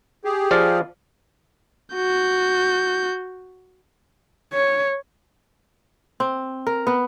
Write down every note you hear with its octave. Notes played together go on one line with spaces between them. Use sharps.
G4 G#4
F3 D5 F5
F#4 G6
C#5
C4
A#4
B3